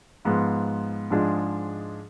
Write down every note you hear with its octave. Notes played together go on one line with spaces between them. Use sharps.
G#2 F3 B3 F4
G#2 F3 G#3 D4 G#4